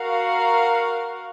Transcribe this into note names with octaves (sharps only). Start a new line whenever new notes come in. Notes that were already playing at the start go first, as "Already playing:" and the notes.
Already playing: F#4 A#4 F5